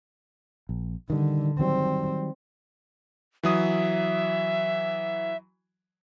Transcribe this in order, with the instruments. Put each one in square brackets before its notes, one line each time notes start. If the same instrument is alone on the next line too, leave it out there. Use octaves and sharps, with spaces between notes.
[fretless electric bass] A#1
[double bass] D3 [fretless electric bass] D#3 G3
[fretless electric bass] D#3 F#3 G3 [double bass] C4
[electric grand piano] E3 F#3 D#6 [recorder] E5